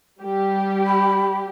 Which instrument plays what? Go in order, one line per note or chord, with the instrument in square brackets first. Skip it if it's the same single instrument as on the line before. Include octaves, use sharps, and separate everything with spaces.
[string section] G3 G4
[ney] B5